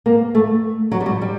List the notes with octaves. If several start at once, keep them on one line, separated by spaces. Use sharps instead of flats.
A#3
A3
F#3
G3
F#3
G3